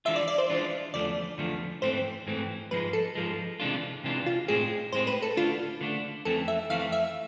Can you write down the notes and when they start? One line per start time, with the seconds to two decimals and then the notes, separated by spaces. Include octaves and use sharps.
0.05 E3 G#3 D4 F4 E5
0.16 D5
0.28 D5
0.38 C5
0.50 E3 G#3 D4 F4
0.94 E2 D3 F3 A3 D5
1.38 E2 D3 F3 A3
1.82 G#2 E3 A3 C4 C5
2.26 G#2 E3 A3 C4
2.71 G#2 F3 G#3 B4
2.93 A4
3.15 G#2 F3 G#3
3.60 C3 E3 G#3 D4 F4
4.04 C3 E3 G#3 D4 F4
4.26 F4
4.48 A2 G#3 C4 G#4
4.92 A2 G#3 C4 C5
5.07 B4
5.22 A4
5.37 D3 A3 D4 F4
5.81 D3 A3 D4
6.25 F2 E3 A3 C4 A4
6.48 E5
6.70 F2 E3 A3 C4 F5
6.92 E5